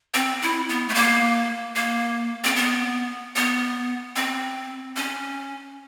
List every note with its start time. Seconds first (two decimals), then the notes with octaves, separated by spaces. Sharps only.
0.14 C4
0.42 E4
0.69 B3
0.89 A3
0.94 A#3
1.76 A#3
2.44 C4
2.56 B3
3.36 B3
4.16 C4
4.96 C#4